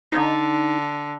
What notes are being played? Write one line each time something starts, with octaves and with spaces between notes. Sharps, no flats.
D3 D#4